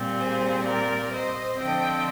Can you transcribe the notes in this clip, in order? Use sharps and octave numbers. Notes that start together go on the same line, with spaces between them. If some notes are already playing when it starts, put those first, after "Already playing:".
Already playing: A#2 G3 C4
G#4 C5
A#4 D5
C5 D#5
D3 F3 C4 D#5 G5